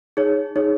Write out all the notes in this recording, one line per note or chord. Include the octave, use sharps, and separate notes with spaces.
D#4 G#4 C#5
D#4 G#4 C#5